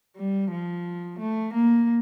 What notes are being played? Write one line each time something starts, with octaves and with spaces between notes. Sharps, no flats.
G3
F3
A3
A#3